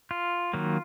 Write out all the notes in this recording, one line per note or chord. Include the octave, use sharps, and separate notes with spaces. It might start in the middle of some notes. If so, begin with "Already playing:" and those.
F4
D#3 F#3 A#3